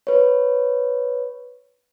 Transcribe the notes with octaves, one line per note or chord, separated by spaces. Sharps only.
B4 C#5